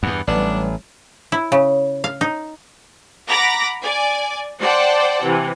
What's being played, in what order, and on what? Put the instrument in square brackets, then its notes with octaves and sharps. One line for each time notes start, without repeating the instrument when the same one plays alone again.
[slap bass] E2 G2 [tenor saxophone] B3
[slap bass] A1 [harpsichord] F#3 G3 B3 [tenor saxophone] D4
[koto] E4
C#3
F5
D#4
[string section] F#5 A#5 B5 D6 A#6
D5 G#5
C5 D5 F#5 G5 A5
C3 E3